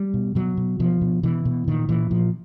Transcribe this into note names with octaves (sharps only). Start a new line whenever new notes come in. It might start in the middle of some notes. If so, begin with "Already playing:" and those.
Already playing: G3
B2
B2 F#3
B2
B2 F3
B2
B2 E3
B2
A#2 D#3
A#2 E3
A#2 F3